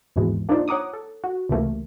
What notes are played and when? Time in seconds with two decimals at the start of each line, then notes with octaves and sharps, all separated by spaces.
0.16 G#1 D#2 G#2 B2 E3 G#3
0.49 A#3 D4 D#4 F4 C5 D5
0.68 C#5 F#5 A#5 D6 D#6
0.93 A4
1.24 F#4
1.49 C#2 C3 E3 A3 A#3